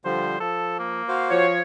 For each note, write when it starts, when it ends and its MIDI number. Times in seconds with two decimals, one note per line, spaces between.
0.05 0.38 50
0.05 0.38 53
0.05 0.38 55
0.05 0.37 72
0.40 1.02 53
0.40 0.75 69
0.79 1.42 58
1.08 1.46 66
1.08 1.46 72
1.08 1.46 77
1.30 1.61 53
1.30 1.61 73